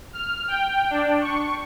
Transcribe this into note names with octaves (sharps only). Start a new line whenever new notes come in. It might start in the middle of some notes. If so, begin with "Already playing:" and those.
F6
G5
D4
C#6